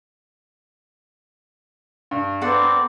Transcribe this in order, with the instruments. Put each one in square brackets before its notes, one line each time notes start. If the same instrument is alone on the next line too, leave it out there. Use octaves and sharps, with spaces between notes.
[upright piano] G2
[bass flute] B3 [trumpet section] C4 D5 A#5 [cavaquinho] A4 F#5 C6